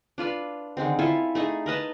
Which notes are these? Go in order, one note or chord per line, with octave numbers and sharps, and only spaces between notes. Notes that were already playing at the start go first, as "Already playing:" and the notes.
D4 F4 B4 D5
D3 D#3 G#3 C4
E4 F4 A4 G#5
A3 D#4 G#4
A#4 B4 D#5 A5